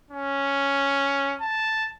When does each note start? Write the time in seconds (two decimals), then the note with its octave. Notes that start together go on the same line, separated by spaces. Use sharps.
0.11 C#4
1.41 A5